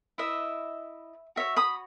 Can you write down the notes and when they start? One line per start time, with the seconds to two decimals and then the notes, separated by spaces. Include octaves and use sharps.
0.18 E4 B4 D#5 E5
1.36 F#4 C#5 E5
1.56 B5 D#6